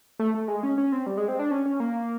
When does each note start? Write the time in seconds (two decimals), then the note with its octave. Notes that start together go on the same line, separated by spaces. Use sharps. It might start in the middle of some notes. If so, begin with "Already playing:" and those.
0.19 A3
0.34 A3
0.48 G#3
0.63 C#4
0.78 C#4
0.92 C4
1.06 G3
1.17 G#3
1.28 C4
1.39 D4
1.51 C#4
1.66 C#4
1.80 A#3